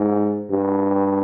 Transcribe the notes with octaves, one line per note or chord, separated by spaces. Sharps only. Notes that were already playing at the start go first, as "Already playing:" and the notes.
Already playing: G#2
G2